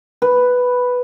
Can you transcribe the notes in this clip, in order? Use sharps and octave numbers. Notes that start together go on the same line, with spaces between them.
B4